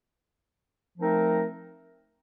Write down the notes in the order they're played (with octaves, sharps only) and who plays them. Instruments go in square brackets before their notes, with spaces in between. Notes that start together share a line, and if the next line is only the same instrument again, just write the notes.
[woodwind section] F3 A3 C4 D#4 A#4